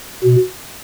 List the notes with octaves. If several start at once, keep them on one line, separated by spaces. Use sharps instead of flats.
B2